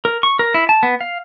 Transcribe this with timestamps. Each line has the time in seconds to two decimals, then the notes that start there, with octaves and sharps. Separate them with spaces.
0.05 A#4
0.23 C#6
0.39 A#4
0.54 E4
0.69 A5
0.83 B3
1.01 F5